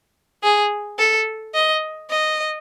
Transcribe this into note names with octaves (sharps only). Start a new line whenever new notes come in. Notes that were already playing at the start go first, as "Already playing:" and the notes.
G#4
A4
D#5
D#5